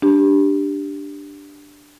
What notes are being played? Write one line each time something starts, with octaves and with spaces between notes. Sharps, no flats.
D4 G4